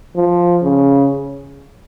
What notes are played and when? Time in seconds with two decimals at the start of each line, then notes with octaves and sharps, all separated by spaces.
0.16 F3
0.64 C#3